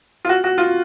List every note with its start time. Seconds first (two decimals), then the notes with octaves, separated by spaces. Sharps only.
0.25 F4
0.29 F#4
0.44 F#4
0.58 F4